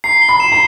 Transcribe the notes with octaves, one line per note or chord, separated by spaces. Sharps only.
A#5 C7
G7
B5
E7
A#5